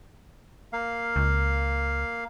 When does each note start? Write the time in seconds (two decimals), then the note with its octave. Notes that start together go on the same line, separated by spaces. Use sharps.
0.73 A#3 F5
1.16 C#2